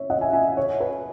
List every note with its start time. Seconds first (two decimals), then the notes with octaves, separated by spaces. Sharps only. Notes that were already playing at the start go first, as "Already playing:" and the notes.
Already playing: C#5 E5
0.10 D#5 F#5
0.21 E5 G#5
0.33 E5 G#5
0.57 C#5
0.80 B4